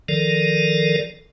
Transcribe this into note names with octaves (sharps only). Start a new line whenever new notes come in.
D#3 F3 A4 A#4 D5